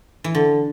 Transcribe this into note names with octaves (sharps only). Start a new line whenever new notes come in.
E3
D3